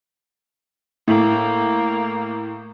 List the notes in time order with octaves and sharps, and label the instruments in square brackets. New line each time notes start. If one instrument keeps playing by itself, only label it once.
[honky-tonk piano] A2 [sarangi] A#3